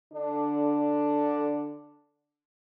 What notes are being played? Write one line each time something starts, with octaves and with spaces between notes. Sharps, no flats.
D3 D4